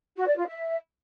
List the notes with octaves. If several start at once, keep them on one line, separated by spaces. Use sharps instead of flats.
F#4
D5
F4
E5